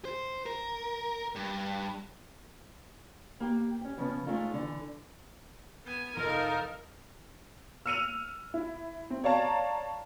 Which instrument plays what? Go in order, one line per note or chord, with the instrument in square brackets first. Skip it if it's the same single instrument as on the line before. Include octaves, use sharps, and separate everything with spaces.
[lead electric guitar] C5
A#4
G2
[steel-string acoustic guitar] A#3 G4 G5
C#4 G4
C#3 F3 B3 C#4
G#3 A3 C#4 D#4 F4 A#4
D3 E3
[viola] B3 G#5
[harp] F1 F3 D7 [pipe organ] D#4 [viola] A4 [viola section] A#4
[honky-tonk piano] E6 F6 C#7 D#7 F7
E4
C4
C#5 D5 F5 A5 A#5